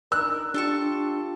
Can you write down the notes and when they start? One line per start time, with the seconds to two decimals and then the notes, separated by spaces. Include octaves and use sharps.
0.12 D4 D#4 A#4 E6 F#6
0.54 D4 F4 G4 A4 A5 C#6